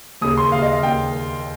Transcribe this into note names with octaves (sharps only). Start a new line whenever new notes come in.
D#2 C#3 D#6
C6
D#2 C#3 F5
D#5
F5
D#2 C#3 G5